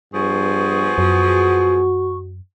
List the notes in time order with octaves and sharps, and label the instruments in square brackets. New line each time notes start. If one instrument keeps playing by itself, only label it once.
[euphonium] G2 [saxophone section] F3 B3 G#4 [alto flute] C#6
[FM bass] F#2 [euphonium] F#4